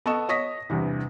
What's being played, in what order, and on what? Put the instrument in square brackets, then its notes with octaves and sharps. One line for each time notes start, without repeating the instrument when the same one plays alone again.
[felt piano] B3 A4 D#5 C#6 E7
C#5 D#5 C#6 D#6 A#6 B6
E2 G2 C3 E3